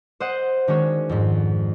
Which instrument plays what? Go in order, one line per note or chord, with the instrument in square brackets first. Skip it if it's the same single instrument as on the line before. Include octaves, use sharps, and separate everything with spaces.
[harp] C5 D#5 F#5 C#7
D#3 G#3 C#4 D4 F#4 C#5
F2 G#2